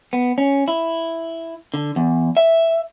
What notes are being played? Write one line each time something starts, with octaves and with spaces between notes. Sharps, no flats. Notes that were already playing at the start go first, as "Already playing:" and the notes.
B3
C#4
E4
D3
E2
E5